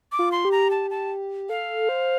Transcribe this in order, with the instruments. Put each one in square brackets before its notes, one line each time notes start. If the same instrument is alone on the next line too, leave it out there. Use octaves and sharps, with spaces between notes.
[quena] D6
[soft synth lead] F4
[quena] C6
[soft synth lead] G4
[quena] A#5
A5
A5
[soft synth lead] A4 [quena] F5
[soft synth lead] C5